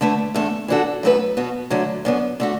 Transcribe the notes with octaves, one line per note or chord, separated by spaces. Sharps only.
D3 A3 E4 B4
E2 D3 A3 D4
E3 D4 F#4 A4
F#2 F#3 A3 F#4 B4
B2 B3 F#4
D2 D3 F#3 A3 F#4
F#2 D3 B3
D3 A3 F#4